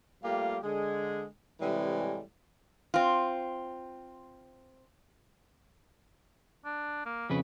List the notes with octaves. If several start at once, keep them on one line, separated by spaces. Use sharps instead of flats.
G3 A3 A#3 F4 G4 F5
D3 G#3 G#4
A2 C3 E3 G3 G#3
C4 F4
D4
A#3
F2 C#3 B4